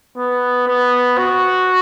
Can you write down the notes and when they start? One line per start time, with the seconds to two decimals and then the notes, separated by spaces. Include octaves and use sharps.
0.17 B3
0.67 B3
1.18 F#4